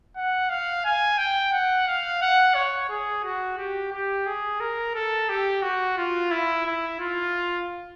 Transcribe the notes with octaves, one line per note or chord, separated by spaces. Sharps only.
F#5
F5
G#5
G5
F#5
F5
F#5
C#5
G#4
F#4
G4
G4
G#4
A#4
A4
G4
F#4
F4
E4
E4
F4